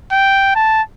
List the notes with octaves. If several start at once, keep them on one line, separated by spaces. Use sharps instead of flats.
G5
A5